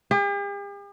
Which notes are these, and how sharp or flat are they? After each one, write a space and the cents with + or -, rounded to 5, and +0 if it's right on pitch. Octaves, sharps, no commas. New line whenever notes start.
G4 +45